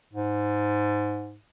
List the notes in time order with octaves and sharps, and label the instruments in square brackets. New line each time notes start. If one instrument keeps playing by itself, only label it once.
[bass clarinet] G#2